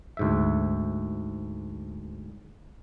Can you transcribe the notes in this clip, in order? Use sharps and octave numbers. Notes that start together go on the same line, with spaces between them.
D2 G#2 E5